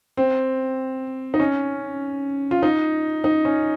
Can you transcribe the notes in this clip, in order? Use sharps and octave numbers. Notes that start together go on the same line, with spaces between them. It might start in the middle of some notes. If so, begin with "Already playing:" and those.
C4
D#4
C#4
F4
D#4
D#4
C#4